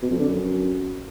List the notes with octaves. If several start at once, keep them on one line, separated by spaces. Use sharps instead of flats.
B2
F2
D3
F#2